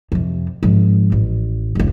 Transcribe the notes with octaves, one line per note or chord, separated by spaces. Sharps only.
F2 C3
G#1 F3
A1
F1 C#2